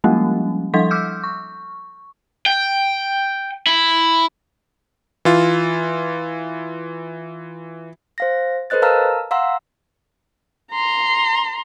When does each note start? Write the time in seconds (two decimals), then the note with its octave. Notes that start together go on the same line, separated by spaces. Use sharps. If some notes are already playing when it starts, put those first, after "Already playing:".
0.04 F3 G3 G#3 A#3 C#4
0.74 F3 G3 A4 C6 B6
0.91 D6 E6 F6 G6
1.23 C#6
2.46 G5
3.67 E4
5.25 E3 F4
8.18 C5 F5 A#6
8.70 A4 B4 C5 D#5 F#6 A6
8.82 A#4 F5 A5 A#5 E6 F6
9.31 F5 F#5 A#5 C6 E6
10.72 A#5 C6